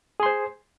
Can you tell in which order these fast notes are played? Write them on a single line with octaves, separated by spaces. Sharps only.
G#4 C6 C5